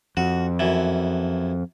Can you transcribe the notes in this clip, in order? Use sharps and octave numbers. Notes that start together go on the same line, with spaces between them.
F2 F#4
F#2 E3